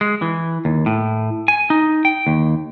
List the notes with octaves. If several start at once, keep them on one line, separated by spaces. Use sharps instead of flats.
G#3
E3
D#2
A2
G#5
D#4
G5
D#2